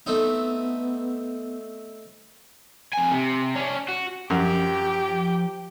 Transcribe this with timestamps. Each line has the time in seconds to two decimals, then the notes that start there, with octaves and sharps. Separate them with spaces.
0.06 A3 B3 C4 D#4
2.94 F2 G#5
3.11 C3
3.55 C#4 D4
3.88 F#4
4.30 F#2 F3 G4